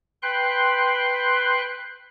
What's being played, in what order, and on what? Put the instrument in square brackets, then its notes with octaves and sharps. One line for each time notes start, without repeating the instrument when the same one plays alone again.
[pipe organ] B4 G5 C6 F#6